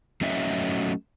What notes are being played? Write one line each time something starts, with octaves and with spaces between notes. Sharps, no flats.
F#3 A3 C#4 C#5 D#5 E5